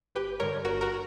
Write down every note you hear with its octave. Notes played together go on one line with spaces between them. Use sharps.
G1 G4 B4
G2 D3 A#4 C#5
G1 F#4 A#4
F#4 A#4